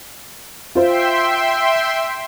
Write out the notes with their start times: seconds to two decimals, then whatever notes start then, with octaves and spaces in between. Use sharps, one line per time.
0.75 F4 C5 E5 G5 C6